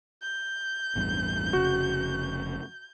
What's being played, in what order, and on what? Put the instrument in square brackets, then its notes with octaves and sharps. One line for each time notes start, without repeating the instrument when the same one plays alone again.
[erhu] G6
[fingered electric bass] A1 E2 G2
[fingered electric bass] F1 C#3 [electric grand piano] F#4